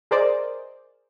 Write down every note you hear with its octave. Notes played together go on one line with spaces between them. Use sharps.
G#4 A#4 C5 D5 D#5